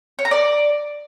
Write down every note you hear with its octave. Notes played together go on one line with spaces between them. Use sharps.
C#5
A#5
D5